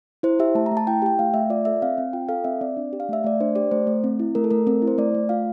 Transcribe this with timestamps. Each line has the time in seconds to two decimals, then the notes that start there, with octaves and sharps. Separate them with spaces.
0.23 E4 C5
0.39 G4 E5
0.55 A3 A5
0.66 A#5
0.71 A3
0.77 A5
0.87 E4 G5
1.02 G4 G5
1.19 A3 F5
1.34 A3 E5
1.50 F4 D5
1.65 A4 E5
1.82 C4 F5
1.98 C4
2.13 F4 G5
2.29 A4 F5
2.44 C4 E5
2.61 C4 D5
2.77 D4
2.93 G4
3.00 F5
3.09 A3 E5
3.24 A3 D5
3.40 D4 C5
3.55 G4 D5
3.71 A3 C5
3.87 A3
4.04 C4
4.20 E4
4.35 A3 A#4
4.44 A4
4.51 A3 A#4
4.67 C4 A#4
4.82 E4
4.87 C5
4.98 A3 D5
5.15 A3
5.29 F4 F5